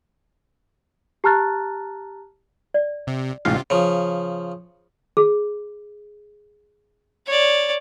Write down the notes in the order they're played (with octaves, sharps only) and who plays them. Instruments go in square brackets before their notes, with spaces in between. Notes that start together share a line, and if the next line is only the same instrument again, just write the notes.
[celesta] G4 A5 A#5 F6 F#6 A6
[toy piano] D5
[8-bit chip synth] C3
[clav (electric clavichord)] A1 G#2 F5 [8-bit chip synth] C3 F4 [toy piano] C#4
[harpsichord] C#3 F3
[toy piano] G#4
[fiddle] C#5 D5